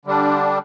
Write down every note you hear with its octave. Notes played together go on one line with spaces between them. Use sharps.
D3 G3 D4